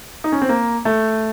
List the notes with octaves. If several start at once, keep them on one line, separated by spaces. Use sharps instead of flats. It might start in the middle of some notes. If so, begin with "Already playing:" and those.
D#4
C#4
C4
A#3
A3